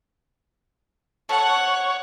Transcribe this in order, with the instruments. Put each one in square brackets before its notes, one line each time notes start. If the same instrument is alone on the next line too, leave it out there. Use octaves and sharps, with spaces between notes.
[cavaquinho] A4 [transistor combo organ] C#5 [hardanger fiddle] F#5